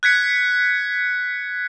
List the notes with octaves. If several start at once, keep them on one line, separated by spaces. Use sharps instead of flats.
F#6 G#6 B6 C#7